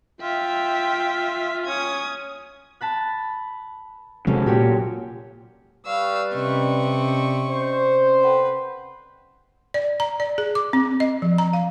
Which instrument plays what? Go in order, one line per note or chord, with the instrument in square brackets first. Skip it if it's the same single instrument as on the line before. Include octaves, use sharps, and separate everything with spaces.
[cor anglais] F4 [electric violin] E5 G5
[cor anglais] C#4 [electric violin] D#6 G#6
[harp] A5 B5 F#6
[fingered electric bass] C3 F#3 G#3 [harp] C#4 A4
[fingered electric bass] A#2 [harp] F#4 G4 C#5
[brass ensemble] G3 B4 [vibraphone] D5 C#6 [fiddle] F5 E6
[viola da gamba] C3 [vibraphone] C#4 D5 D#5 [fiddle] C#6
[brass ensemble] C5
[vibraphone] A4 F#5 G5 [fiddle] B4
[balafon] D5
A#5
D5
G#4
D6
C4
D#5
F3
A#5
F5